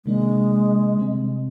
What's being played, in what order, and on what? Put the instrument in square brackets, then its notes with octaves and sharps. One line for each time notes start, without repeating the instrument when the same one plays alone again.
[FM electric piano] C3 D#3 A#3 D4 [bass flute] G#3
[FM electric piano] C3 G3 C4